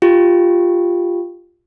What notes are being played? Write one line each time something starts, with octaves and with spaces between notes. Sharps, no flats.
F4 G4